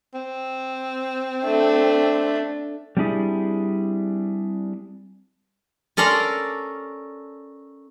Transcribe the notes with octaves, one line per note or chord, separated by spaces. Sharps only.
C4
A3 D4
G3 C4 D4 E4 G#4
C#4 A4 A#4 D5 A#5 C6